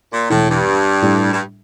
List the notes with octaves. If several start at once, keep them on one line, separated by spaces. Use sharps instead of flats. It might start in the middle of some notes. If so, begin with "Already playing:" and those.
A#2
E1 E2 A2 E3
G2
A2 G3 D4 G4
G2